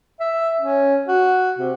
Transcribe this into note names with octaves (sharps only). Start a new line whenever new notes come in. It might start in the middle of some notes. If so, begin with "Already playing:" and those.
E5
C#4
F#4
C3